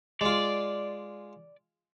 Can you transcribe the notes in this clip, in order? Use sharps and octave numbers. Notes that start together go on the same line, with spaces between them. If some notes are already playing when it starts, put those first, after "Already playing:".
G#3 F4 D5